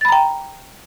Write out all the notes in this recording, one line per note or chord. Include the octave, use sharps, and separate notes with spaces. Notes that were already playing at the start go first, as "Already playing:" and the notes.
G5 A#5 B5 A6